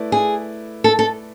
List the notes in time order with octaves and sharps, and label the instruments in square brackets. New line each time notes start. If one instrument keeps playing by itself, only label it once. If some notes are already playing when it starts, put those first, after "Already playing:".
Already playing: [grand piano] A3 E4 B4 D5
[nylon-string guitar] G#4
A4
A4